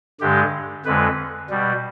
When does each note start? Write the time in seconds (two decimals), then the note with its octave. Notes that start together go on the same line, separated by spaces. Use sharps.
0.20 G2 D3 G#3 G4
0.85 F2 D3 G#3 B4
1.50 B2 G3